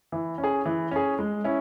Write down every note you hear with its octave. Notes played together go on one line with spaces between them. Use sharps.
E3
C#4
G#4
E3
C#4 G#4
G#3
C#4 E4